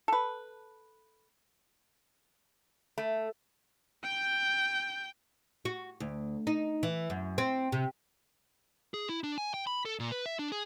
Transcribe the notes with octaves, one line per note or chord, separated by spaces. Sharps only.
A4 B4
A3
G5 G6
F#4
D2
D#4
E3
F#2
C4
C3
G#4
E4
D4
G#5
G5
B5
A4
A#2
B4
E5
D4
G#4